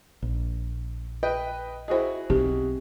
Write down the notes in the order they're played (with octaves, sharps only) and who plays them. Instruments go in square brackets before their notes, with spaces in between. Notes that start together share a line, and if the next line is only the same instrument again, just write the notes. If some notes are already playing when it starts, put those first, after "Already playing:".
[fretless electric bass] A#1
[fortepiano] B4 D#5 G5
[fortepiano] E4 F#4 G#4 [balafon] C5 D#5
[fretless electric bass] B1 [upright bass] C4 [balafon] G4